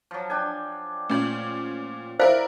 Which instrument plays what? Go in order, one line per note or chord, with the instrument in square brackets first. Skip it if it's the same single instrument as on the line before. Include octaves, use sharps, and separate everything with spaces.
[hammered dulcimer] F3 F#3
D4 G5 G#5
[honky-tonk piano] A#2 C#4 [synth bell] A3 G6 F#7
[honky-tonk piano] E4 A#4 D5 [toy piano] C5 F5